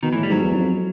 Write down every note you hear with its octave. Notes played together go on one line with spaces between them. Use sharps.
B2 D#3
A2 E3
G3
G#2 F#3
E2
F2